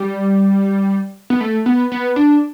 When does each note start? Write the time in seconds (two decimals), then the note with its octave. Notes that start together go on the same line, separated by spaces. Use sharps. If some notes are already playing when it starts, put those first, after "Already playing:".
Already playing: G3
1.30 B3
1.41 A3
1.66 B3
1.92 B3
2.16 D4